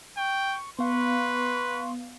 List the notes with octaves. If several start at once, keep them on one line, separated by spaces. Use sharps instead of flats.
G5 C#6
B3 B4 F5 C6 C#6